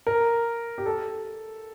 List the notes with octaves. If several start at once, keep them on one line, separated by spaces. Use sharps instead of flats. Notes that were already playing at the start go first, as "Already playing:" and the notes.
A#4
G4
A4